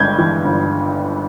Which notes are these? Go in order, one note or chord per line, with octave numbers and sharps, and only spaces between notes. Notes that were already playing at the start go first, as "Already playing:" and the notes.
Already playing: G1 G2 G#3 G6 G#6
E3
G1